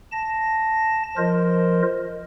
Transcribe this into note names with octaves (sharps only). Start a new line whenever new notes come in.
A5 A#6
F3 F4 A#4 C5 D#5